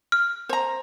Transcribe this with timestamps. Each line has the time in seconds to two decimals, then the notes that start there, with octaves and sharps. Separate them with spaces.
0.12 F6
0.49 C5 A#5